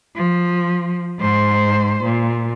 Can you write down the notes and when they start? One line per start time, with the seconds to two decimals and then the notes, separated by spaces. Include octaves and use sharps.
0.15 F3
1.19 G#2 C5
2.03 A#2